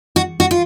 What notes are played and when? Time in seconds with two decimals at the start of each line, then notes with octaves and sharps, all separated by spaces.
0.16 F#4
0.40 F#4
0.51 F4